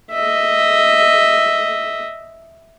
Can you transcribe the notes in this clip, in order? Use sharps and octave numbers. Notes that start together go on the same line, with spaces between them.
D#5 E5